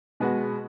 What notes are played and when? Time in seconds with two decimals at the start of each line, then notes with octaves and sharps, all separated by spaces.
0.20 B2 G#3 B3 F#4